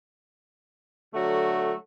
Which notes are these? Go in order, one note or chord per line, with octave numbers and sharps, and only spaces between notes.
D3 F#3 A3 F#4